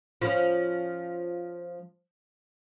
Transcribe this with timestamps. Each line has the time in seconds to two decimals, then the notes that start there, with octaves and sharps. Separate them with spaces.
0.22 F3 C#4